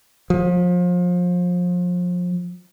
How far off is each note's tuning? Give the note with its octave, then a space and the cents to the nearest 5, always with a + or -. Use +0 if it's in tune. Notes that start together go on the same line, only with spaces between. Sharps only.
F3 +30